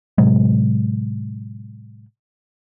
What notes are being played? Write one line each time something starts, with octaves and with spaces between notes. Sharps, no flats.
A2 C3 F#3 G#3